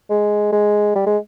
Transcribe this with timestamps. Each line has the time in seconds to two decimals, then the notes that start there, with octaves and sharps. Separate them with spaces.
0.10 G#3
0.52 G#3
0.96 G3
1.06 G#3